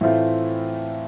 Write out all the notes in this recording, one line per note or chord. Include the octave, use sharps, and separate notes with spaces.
A2 E3 A3 C4 F4